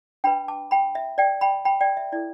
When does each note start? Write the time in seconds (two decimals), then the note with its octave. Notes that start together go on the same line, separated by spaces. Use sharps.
0.24 D4 B4 G5 B5
0.48 A5 D6
0.71 G5 B5
0.95 E5
1.18 D5 G5
1.41 G5 B5
1.65 G5 B5
1.81 D5 G5
1.97 E5
2.12 E4 A4 D5